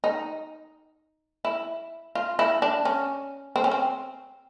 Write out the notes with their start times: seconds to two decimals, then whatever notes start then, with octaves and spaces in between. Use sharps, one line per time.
0.04 D#4
1.45 E4
2.15 F4
2.39 E4
2.62 D4
2.85 C#4
3.56 C4
3.64 C#4
3.71 C4